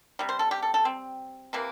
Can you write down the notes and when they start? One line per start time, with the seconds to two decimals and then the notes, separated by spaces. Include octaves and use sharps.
0.19 C3 G3
0.29 C5
0.39 A4
0.51 G4
0.62 A4
0.74 A4
0.85 C4
1.53 C3 E3 A#3